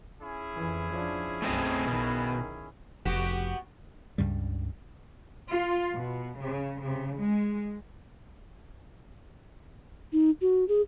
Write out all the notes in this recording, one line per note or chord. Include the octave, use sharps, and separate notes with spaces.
C#4 E4 G#4
F2 E3
F3 D4
B1 F#2 A3 C4 D#5
B1 B2 D#3
F1 B3 F#4 G4
C#2 G2 C#3 G3
F4
B2
C#3
C#3
G#3
D#4
F#4
G#4